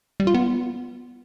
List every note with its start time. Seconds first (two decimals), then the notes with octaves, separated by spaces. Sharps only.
0.20 G3
0.27 F4
0.34 B3